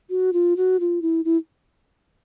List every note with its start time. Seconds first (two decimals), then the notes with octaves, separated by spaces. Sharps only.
0.10 F#4
0.33 F4
0.57 F#4
0.80 F4
1.02 E4
1.25 E4